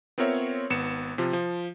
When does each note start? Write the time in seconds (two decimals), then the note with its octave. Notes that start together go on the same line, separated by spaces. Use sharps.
0.18 B3 C4 F4 A#4 C#5 E5
0.70 G#1 B3 C#7 E7
1.18 C3 F3 F4
1.33 F3